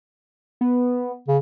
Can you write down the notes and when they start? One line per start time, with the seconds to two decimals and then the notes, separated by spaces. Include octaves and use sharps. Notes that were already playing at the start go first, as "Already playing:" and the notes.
0.61 B3
1.28 C#3